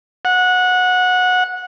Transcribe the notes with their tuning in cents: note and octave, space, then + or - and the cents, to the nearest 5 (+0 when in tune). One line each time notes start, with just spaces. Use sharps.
F#5 -20